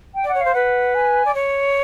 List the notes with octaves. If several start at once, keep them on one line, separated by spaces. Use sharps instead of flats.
G5
D5 F#5
C#5
C5 F5
B4 F#5
G#5
D5
C#5